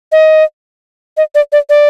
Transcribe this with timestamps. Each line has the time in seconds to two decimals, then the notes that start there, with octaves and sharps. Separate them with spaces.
0.12 D#5
1.17 D#5
1.35 D5
1.52 D5
1.69 D5